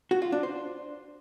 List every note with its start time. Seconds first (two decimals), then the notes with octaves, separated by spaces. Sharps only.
0.11 F#4
0.22 F4
0.32 D4
0.43 C5